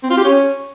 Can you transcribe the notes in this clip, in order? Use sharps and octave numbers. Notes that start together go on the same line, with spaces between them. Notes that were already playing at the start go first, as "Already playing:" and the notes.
C4
F4
G4
C#4